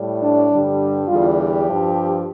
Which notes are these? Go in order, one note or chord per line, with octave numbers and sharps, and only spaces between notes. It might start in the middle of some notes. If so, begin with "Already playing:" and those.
Already playing: A2 G3
D4
G2 D3 G3
E2 D3 G3 F4
G4
G2 F3